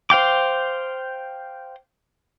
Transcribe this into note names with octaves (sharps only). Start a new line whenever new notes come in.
C5 F5 G5 D6